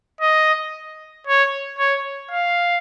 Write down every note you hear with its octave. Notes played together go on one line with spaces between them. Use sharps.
D#5
C#5
C#5
F5